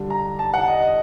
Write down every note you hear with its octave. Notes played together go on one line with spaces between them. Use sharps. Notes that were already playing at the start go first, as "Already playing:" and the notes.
Already playing: G2 D3 G3
A#5
A5
F#5
D#5
D#5